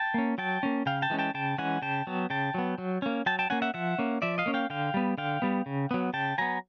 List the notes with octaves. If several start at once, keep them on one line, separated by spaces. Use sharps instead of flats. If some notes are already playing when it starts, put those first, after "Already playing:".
Already playing: G5 A5
A#3 C#4
F#3 G5 A5
A#3 C#4
C#3 F5 G5
G5 A5
E3 G#3 C#4
G5 A5
C#3 G5 A5
E3 G#3 C#4 F#5 G#5
C#3 G5 A5
F#3 B3
C#3 G5 A5
F#3 B3
F#3
A#3 C#4
F#3 G5 A5
G5 A5
A#3 C#4 F#5 G#5
E5 F#5
F3 E5 F#5
A#3 C#4
F3 D5 E5
D#5 F5
A#3 C#4
F5 G5
D3 F5 G5
G3 B3
D3 F5 G5
G3 B3
C#3
F#3 B3
C#3 G5 A5
F#3 B3 G#5 A#5